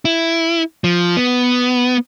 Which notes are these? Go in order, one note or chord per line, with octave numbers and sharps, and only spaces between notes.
E4
F3
B3